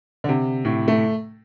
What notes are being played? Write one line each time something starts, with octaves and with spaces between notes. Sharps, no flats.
D3
C3
A2
A3